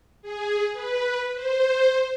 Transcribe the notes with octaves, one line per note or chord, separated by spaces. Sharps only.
G#4
B4
C5